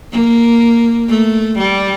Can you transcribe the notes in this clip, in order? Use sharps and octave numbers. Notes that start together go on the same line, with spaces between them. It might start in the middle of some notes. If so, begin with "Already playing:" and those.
A#3
A3
G3